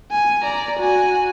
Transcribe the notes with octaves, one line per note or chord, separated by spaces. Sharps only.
G#5
D5 A#5
F#4 G#5